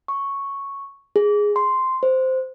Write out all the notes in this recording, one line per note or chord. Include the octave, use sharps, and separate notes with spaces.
C#6
G#4
C6
C5